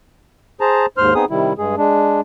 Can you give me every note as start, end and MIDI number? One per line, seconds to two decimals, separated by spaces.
0.61 0.86 68
0.61 0.86 72
0.61 0.86 81
0.61 0.86 82
0.98 1.14 39
0.98 1.14 44
0.98 1.14 72
0.98 1.14 84
0.98 1.14 89
1.14 1.25 59
1.14 1.25 60
1.14 1.25 63
1.14 1.25 68
1.14 1.25 87
1.30 1.53 48
1.30 1.53 51
1.30 1.53 55
1.30 1.53 64
1.58 1.75 43
1.58 1.75 56
1.58 1.75 68
1.77 2.21 56
1.77 2.21 62